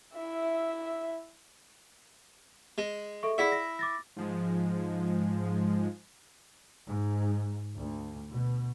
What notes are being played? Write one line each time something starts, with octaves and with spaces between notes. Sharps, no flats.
E4 E5
G#3
A4 E5 C#6
E4 G#4 D5 E5 F#5
A#6
D6 A6 A#6
G#2 F3 G#3
G#2
D2
B2